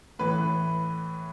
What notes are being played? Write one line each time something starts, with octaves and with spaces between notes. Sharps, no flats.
A2 E3 B4